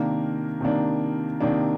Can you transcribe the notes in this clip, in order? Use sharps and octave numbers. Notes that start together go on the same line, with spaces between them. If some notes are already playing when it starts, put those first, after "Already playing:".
Already playing: C3 D#3 A#3 D4
C3 D#3 A#3 D4
C3 D#3 A#3 D4